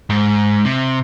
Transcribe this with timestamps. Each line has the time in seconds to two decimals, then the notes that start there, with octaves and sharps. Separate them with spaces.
0.10 G#2
0.65 C3